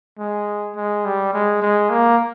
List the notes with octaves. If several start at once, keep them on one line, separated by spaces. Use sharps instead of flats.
G#3
G#3
G3
G#3
G#3
A#3